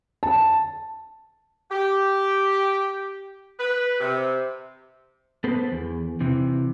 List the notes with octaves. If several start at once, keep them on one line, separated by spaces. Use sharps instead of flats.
A5
G4
B4
C3
B3 A4 B4 C5
E2
C3 E3